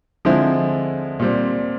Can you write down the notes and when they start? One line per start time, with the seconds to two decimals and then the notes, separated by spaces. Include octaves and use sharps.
0.25 D3 F3 G#3 C4 E4
1.20 A#2 G3 C4